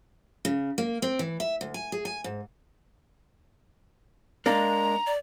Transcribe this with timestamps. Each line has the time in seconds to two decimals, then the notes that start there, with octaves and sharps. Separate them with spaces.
0.45 C#3
0.78 A#3
1.02 C4
1.19 E3
1.40 E5
1.61 D2
1.74 G#5
1.92 G#4
2.05 G#5
2.24 G#2
4.46 G#3 A#3 D4 A#5
5.06 D5